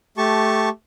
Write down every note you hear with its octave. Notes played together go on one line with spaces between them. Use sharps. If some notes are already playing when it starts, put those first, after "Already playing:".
A3 G4 A5 C#6